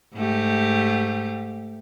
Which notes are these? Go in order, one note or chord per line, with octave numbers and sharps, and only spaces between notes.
G#2 A3 G4